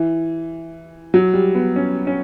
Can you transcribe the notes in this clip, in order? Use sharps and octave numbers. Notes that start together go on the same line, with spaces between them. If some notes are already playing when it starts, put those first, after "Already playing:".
Already playing: E3
F#3
G3
B3
C#4
C#4